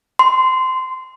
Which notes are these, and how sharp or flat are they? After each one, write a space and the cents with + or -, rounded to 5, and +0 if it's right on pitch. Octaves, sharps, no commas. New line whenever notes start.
C6 -20